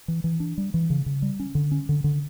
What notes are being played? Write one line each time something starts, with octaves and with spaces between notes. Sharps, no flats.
E3
E3
D4
G3
E3
C#3
C#3
G3
C#4
D3
C#4
D3
D3